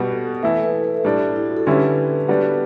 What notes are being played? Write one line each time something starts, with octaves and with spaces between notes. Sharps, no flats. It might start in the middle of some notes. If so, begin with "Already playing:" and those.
Already playing: B2 G3 B3 F#4
A4
E3 A3 E4 B4
A4
B4
A4
A4
A2 G3 D4 G4
E4
F#4
A4
D3 G3 C#4 E4 G4 B4
B4
G3 B3 D4 F#4